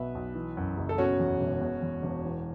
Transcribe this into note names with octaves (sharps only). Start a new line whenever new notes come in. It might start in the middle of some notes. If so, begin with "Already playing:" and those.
Already playing: B1 B2 F#3 B4 E5
B1
E3
F#2
F#1
A4
B2 C#4 F#4
E2
E1
B2
E2
E1
E3